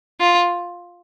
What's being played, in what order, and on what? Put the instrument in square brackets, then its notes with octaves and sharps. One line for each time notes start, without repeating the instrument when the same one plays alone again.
[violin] F4